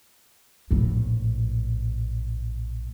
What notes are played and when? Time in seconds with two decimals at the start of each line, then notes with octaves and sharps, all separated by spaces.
0.71 A#1 A2